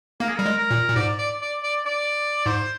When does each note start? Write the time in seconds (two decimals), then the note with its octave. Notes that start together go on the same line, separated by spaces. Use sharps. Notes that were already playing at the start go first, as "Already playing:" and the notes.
0.20 A#3 A#4
0.29 G#4
0.37 G3 A#4
0.46 G#3
0.58 A#4
0.71 A#2
0.88 A#2
0.96 G#2 D5
1.18 D5
1.41 D5
1.63 D5
1.86 D5
2.46 G#2 C5